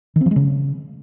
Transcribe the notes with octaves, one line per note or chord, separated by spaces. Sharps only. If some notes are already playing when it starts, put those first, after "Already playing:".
D#3
C4
F3
G#3
C#3